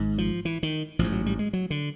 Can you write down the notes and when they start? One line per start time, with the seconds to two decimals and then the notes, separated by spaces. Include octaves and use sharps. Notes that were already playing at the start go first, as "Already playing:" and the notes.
Already playing: G#1 G#2
0.18 F3
0.45 E3
0.63 D#3
0.99 A1 G#2 F3
1.12 F#3
1.26 G3
1.39 G#3
1.53 F#3
1.70 D3